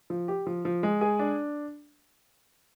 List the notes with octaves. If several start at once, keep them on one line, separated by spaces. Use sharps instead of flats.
F3
G4
F3
F3
G#3
G#4
D4